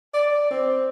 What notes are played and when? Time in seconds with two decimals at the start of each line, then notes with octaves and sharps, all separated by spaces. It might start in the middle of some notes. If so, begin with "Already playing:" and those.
0.14 D5
0.51 C4